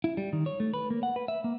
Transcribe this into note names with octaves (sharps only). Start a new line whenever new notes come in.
E4
G3
D#3
C#5
A3
B4
A#3
F#5
B4
E5
A#3